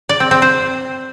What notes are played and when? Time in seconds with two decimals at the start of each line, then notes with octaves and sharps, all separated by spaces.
0.09 D5
0.20 C4
0.31 C4
0.42 C5